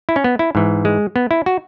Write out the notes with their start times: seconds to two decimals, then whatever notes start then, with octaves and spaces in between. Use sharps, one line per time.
0.09 E4
0.16 C#4
0.24 B3
0.39 E4
0.55 G#2 E3
0.85 G#3
1.16 B3
1.31 E4
1.46 F#4